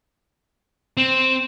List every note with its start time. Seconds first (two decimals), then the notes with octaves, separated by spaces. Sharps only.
0.97 C4